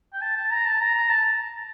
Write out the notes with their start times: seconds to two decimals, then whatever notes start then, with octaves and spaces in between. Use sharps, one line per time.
0.13 G5
0.22 A5
0.37 A5
0.51 A#5
0.65 A5
0.80 A#5
0.94 A#5
1.09 A5